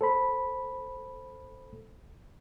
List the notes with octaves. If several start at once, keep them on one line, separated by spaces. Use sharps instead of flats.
A4 C5 B5